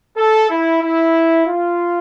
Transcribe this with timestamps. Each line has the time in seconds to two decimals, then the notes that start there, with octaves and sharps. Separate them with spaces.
0.17 A4
0.50 E4
0.82 E4
1.46 F4